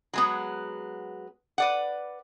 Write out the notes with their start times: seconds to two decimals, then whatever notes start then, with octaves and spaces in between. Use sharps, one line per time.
0.13 F#3 G#3 B3
1.58 B4 D5 F#5